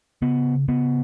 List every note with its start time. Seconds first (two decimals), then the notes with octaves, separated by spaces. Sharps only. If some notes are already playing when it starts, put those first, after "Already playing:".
0.22 C#3 B3
0.68 C#3 B3